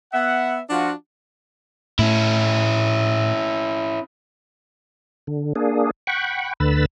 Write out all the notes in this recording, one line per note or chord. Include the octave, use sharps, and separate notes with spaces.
B3 E5 F#5
F3 D4 F4 F#4
A2 A3 C#4 E4
D3
A#3 D4 G#4
F#5 G5 B5 C#6
D2 D3 B4 B5 E6 A6